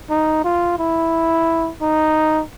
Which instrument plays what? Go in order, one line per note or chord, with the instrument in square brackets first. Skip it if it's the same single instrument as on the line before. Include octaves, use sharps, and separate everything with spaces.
[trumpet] D#4
F4
E4
D#4